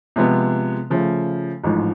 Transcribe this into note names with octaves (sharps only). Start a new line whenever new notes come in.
C3 F3 G#3 B3
C#3 F3 A3
A1 G#2 F3